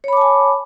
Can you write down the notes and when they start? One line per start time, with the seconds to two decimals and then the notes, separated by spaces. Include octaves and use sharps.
0.04 C#5
0.08 B5
0.13 D6
0.17 A5
0.21 G#5